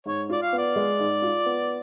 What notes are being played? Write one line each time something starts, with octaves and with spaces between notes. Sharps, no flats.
G#2 C#5
F4 D5
F5
B3
D5
G#3
G#2
F4
B3